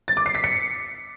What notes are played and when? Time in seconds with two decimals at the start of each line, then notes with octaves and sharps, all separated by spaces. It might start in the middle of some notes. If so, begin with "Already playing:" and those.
0.08 A6
0.17 D6
0.26 C7
0.35 B6
0.44 C#7